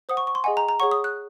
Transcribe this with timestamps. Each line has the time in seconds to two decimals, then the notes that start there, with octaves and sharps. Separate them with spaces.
0.09 C5 F#5 D#6
0.17 C#6
0.27 C#6
0.35 C6
0.44 G#4 D#5 F#5 G#5
0.57 A#5
0.69 A#5
0.80 G#4 C#5 F#5 C#6
0.91 D#6
1.04 F#6